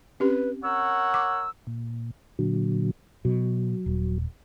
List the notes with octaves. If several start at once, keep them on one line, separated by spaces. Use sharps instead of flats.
C4 C#4 G4 B4
A#4 C#5 F#5 E6
D6
A#2
A#2 D3 F#3
B2 F#3
D#1